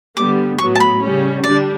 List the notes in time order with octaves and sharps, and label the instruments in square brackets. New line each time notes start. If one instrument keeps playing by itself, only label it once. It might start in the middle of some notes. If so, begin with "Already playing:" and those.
[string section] D3 G3 B3 [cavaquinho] D6
[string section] A2 F#3 B3 [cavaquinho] C#6
[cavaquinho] A5
B5
[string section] C#3 G3 C#4
[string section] D3 G3 D4 [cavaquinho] D5